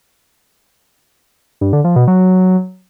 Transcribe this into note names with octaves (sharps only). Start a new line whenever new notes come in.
G2
D3
F3
B2
F#3